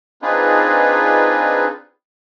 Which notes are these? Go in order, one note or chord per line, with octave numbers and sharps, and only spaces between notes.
C4 D4 D#4 F4 G#4 B4